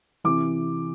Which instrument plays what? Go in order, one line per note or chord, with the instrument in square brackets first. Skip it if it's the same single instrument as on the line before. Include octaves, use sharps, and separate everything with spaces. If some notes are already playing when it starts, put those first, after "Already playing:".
[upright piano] C3 E3 D6